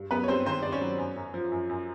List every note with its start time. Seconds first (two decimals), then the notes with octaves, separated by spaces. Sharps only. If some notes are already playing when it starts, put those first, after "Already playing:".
Already playing: G2
0.11 F#3 B3 B4
0.24 C#5
0.28 G2 C4 C5
0.46 D#3 C4 C5
0.62 G2 D5
0.72 C#4 C#5
0.81 F#3
0.98 F#2
1.16 F#2
1.34 F3
1.52 F#2
1.69 F#2